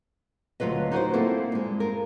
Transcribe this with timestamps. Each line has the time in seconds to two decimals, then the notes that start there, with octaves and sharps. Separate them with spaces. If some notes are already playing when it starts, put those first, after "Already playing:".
0.60 D2 F#3 F4 B4 D#5
0.92 D#4 F#4 A#4 C5
1.13 A#3 C4 E4 F4 A4
1.52 G2 G#3
1.80 F4 A#4